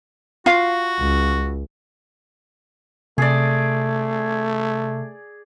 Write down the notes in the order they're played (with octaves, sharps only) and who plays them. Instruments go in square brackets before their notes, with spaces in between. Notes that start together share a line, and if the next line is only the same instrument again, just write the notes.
[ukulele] F4 F5 [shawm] F#4
[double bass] C#2
[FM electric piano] C3 [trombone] A3 [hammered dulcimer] G#4 D5